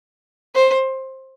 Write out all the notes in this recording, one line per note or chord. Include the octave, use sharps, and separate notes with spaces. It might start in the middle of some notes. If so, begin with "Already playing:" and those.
C5